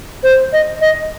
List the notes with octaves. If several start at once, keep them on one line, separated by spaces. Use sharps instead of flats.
C5
D#5
D#5